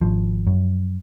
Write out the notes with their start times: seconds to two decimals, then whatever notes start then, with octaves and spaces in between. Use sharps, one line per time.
0.01 G#1 F3
0.47 F#2